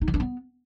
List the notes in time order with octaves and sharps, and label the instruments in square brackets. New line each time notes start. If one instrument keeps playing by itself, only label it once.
[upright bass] D#4
E3
D4
B3